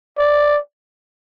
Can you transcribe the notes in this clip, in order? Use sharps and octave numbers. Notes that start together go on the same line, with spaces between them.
D5